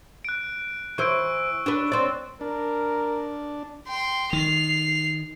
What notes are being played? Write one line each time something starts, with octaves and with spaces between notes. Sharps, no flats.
F#6 D7
E3 C5 C#6 E6 D7
D4 B4
C4 D5
D4 A#4
G5 C6
D#3 C7 F7